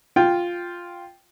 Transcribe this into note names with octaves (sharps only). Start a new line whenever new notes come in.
F4 G5